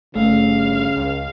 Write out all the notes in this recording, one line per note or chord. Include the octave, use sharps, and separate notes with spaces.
G1 C#3 A3 F5
C#2